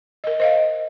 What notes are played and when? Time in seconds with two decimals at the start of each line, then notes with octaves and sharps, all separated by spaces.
0.24 A#4 D#5
0.40 C5 D#5 F5